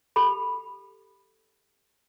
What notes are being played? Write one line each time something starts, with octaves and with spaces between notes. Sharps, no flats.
G4 A4 B5